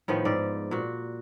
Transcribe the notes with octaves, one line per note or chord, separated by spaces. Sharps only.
A2 D#3 F3 B3
G#2 D5
A#2 F#4